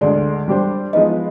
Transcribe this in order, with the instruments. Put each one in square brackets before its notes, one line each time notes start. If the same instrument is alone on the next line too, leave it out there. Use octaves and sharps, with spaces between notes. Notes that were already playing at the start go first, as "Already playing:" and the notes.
[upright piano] D2 D3 G#3 [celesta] D5
[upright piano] G3 D4 G4 C5
[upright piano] F3 G#3 B3 D#4 B4 [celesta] D#5